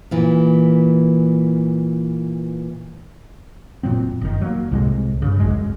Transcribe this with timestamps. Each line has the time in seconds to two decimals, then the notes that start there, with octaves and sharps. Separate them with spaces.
0.11 A#2 E3
3.83 F1 A#2 F#3 C4
4.21 F#1 D#3
4.41 F#3 A#3
4.71 C2 A2 C3 G#3
5.22 G2 C#3
5.40 D1 G#1 F#2 G#3